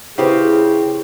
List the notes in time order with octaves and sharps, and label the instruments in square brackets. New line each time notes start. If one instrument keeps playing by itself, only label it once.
[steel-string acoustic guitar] C#3 C4 G4 [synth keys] E4 B4 [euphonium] G#4